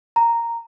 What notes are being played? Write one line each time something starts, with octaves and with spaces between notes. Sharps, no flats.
A#5